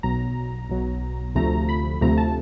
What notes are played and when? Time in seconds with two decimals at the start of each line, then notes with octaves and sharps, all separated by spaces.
0.03 B1 B2 F#3 A#5
0.69 B1 B2 F#3
1.35 D2 C3 F3 A3 A#5
1.69 B5
2.01 D2 C3 F3 A3 A#5
2.18 A5